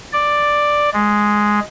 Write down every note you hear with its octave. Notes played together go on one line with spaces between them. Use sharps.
D5
G#3